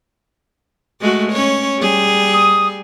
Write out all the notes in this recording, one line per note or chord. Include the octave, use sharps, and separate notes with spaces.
G#3 A3 F#4
C#4 C#5
G3 G#4
D#6